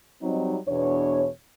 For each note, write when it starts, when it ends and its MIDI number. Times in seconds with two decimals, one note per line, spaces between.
0.22 0.56 54
0.22 0.56 55
0.22 0.56 60
0.22 0.56 63
0.68 1.27 40
0.68 1.27 47
0.68 1.27 62
0.68 1.27 73